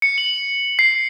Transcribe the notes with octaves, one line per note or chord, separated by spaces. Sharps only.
C#7
F#7
C7